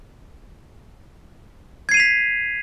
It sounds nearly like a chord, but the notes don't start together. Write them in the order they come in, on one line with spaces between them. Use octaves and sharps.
G#6 C7 D#7 F7 B6